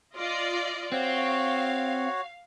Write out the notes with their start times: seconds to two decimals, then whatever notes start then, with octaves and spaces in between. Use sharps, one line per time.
0.17 F4 D5 D#5
0.92 C4 F#4 C#5 F5